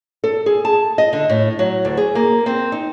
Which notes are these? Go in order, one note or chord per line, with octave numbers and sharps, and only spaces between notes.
A4
G#4
A5
D#5
D3
A2
F#3
D2
G#4
A#3
C4
D#4